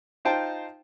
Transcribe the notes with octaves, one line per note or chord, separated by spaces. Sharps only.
D#4 F4 C5 G5 A5